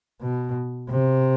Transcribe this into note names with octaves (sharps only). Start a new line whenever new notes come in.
B2
C3